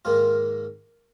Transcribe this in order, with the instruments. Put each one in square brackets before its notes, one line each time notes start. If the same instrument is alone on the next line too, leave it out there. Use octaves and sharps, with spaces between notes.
[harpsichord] G#2 D#3 A#3 F4